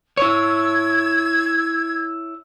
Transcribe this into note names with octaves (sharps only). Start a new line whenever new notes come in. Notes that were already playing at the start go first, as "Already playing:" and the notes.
E4 C#5 E6 G#6